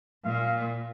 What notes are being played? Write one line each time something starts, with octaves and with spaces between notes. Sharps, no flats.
A#2 F5